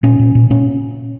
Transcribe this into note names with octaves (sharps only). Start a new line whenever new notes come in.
A#2 C#4
A#2
A#2
A#2 C#4